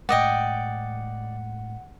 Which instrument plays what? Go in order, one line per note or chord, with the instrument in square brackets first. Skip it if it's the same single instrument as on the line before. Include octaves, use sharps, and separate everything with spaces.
[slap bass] A2 G#3 [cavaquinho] D5 D#5 G5 [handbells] F#5